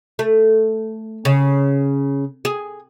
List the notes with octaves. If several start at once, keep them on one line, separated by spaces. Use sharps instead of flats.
A3
C#3
G#4